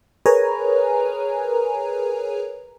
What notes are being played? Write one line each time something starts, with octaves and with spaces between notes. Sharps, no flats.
G#4 A#4 B4 C#5 G#5 A#5